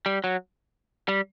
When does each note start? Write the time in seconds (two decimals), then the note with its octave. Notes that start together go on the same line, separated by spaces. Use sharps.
0.06 G3
0.24 F#3
1.08 G3